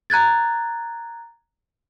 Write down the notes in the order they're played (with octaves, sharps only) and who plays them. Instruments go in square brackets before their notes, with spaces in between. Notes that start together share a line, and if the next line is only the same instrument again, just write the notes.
[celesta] A#5 F#6 G#6 A6